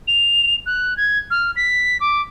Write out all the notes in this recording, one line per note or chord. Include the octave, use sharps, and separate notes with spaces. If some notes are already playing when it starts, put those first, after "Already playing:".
F7
F#6
G#6
F6
B6
D6